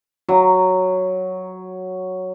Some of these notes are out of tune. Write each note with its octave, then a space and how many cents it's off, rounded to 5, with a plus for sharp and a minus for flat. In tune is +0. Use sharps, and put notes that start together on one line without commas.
F#3 +0 A#5 +0